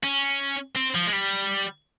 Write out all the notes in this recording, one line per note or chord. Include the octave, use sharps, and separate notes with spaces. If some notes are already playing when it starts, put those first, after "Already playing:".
C#4
C4
F3
G#3
G3